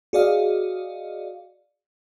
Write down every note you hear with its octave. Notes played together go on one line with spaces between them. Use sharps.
F#4 G#4 D5 D#5 F5